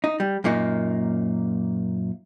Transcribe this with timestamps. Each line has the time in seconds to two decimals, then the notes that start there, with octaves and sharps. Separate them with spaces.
0.04 D#4
0.20 G3
0.44 F#2 A#2 A#3 D#4